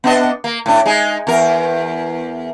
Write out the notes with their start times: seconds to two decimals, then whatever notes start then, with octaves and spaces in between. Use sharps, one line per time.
0.04 B3 D4 D#5
0.44 A#3
0.66 A2 D4
0.86 G#3 D#4 G#4
1.27 E2 A#4